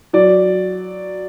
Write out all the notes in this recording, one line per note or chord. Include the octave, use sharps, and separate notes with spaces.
F#3 D5